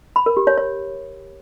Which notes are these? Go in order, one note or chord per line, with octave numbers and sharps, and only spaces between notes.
B5
A#4
G4
C#5
C#5